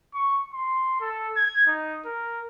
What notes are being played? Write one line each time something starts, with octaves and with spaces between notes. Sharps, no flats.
C#6
C6
A4
G#6
D#4
A#4